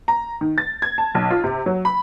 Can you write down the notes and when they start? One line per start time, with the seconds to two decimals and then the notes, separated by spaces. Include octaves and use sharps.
0.08 A#5
0.41 D#3
0.58 A6
0.82 G#6
0.98 A5
1.15 B1
1.31 F4
1.44 C3
1.66 F#3
1.85 B5